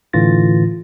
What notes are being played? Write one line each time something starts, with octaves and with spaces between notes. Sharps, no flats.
A2 D3 E3 F4 A6 A#6